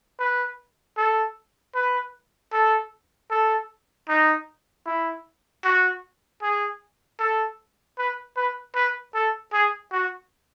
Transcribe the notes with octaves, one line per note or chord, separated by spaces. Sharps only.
B4
A4
B4
A4
A4
D#4
E4
F#4
G#4
A4
B4
B4
B4
A4
G#4
F#4